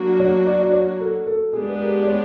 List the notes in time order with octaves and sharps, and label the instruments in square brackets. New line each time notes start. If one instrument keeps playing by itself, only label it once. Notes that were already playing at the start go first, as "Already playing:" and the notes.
Already playing: [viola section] F#3 A#3 D4 F#4
[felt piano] C#5
D5
D5
C#5
A4
A4
[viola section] G#3 B3 D4 G4 [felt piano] G#4
[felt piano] B4
A#4
D5
C#5